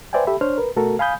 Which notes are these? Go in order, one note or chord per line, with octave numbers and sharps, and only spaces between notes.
B4 C5 D5 E5 G5 G#5
G4 A4 E5 B5
D4 C5 C#5 F6
A#4 B4
B2 A3 F#4 A4 A#4
F5 G#5 B5 D#6 G6